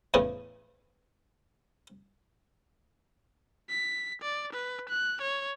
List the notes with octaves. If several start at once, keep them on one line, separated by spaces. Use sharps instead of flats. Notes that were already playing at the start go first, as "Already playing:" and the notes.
E2 A2 C#3 B3
B6
D5
B4
F#6
C#5